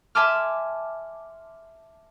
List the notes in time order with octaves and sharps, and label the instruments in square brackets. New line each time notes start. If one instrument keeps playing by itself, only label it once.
[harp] E5 G#5 A5 C6 D6 F6